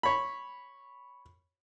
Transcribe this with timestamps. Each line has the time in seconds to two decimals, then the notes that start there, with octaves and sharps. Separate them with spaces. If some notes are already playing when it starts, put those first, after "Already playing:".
0.03 C#5 B5